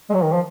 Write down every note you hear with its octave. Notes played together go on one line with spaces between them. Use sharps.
G#3
F#3
D#3
F3